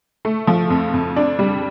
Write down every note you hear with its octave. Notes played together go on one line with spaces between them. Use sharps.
A3
F3
F2
F2
D4
G3